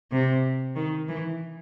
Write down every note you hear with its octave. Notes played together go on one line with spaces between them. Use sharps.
C3
D#3
E3